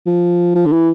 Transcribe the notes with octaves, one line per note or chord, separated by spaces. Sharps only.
F3
F3
D3
E3